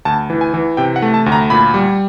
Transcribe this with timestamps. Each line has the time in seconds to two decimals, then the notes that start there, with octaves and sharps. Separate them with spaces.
0.05 D2 A5
0.30 E3
0.41 G#5
0.54 E3
0.77 C3 G5
0.96 F#5
1.02 A3
1.14 A5
1.26 D2
1.32 A#5
1.50 A#2 B5
1.74 G3